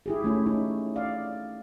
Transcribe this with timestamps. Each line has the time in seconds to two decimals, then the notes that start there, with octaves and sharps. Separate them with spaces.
0.06 E4 G4 G#4
0.24 A3 C#4 E4
0.46 C#4 D#4 E4
0.96 D5 F5